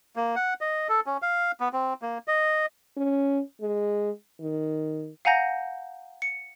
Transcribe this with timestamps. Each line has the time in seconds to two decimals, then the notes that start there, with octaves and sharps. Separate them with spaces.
0.16 A#3
0.36 F#5
0.61 D#5
0.89 A4
1.06 C#4
1.22 F5
1.60 B3
1.73 C4
2.02 A#3
2.28 D#5
2.97 C#4
3.61 G#3
4.40 D#3
5.25 F5 F#5 G#5 A#5 G6 A#6
6.22 C#7